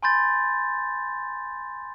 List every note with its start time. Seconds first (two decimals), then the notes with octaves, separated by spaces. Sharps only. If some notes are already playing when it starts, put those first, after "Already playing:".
0.03 G#5 B5 C6 G6 A6